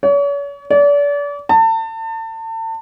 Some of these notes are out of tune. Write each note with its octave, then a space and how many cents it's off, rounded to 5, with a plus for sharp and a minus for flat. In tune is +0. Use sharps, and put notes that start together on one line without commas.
C#5 +40
D5 -35
A5 +35